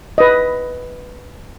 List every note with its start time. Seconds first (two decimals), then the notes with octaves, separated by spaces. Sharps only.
0.18 B4 D#5